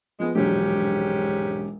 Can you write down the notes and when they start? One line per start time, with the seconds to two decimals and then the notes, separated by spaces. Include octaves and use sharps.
0.20 F3 G#3 B3
0.35 E1 A#1 G#2 F#3 C#4 G4